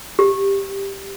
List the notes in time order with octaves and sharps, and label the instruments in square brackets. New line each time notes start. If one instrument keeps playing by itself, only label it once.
[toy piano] G4